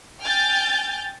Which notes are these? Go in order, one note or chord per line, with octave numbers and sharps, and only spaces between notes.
G5 G#5 F6 G6 A6